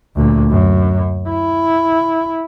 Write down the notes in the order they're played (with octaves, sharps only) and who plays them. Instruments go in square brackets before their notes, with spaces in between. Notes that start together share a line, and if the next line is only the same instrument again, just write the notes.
[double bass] D2 A#2
F#2
E4